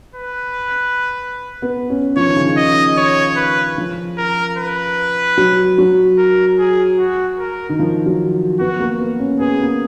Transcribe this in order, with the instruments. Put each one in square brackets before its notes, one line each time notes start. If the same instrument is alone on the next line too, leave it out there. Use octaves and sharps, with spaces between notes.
[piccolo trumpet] B4
[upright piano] B3
C#4
[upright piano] F3 [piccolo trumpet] C#5
[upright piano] D#3
C#3
D#3
[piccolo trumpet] D#5
C#5
B4
[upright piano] F3
[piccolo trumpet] A#4
B4
[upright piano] F#3
F#3
[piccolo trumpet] A#4
G#4
F#4
A#4
[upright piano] D#3
F3
F#3
[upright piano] B3 [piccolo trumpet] F#4
[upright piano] A#3
B3
C#4
[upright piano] B3 [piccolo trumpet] G#4
[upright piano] A#3